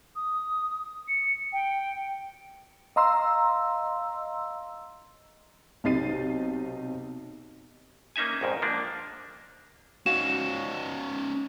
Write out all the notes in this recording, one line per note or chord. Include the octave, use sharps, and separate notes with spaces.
D#6
C#7
G5
D#5 F5 A#5 C6 E6
B1 C3 D#4 A6 C7 D#7
A#3 C#4 D#4 E5 G#5
A#1 F2 G#2
F3 A#3 D4
C#4 D#4 F#4 F5 E7